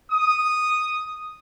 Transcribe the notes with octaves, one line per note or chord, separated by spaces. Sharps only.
D#6